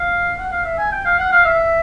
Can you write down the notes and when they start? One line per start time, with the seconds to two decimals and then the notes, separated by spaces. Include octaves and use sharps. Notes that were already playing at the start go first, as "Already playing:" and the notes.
Already playing: F5
0.38 F#5
0.51 F5
0.65 E5
0.78 G#5
0.92 G5
1.05 F5
1.19 F#5
1.31 F5
1.45 E5